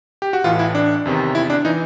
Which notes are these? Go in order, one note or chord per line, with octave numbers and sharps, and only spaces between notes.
G4
F#4
A1 A2 E3 F4
E4
D4
E2 C3 D#3
E4
D4
E3 D#4